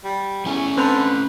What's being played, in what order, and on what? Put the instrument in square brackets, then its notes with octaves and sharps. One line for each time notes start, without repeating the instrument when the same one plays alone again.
[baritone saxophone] G3
[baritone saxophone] E2 [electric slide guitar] A3 C#4 G#5
[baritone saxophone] D3 [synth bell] C4 G6 F7 [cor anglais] B4